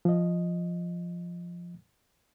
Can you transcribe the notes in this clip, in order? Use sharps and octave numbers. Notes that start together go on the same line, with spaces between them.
F3 D#5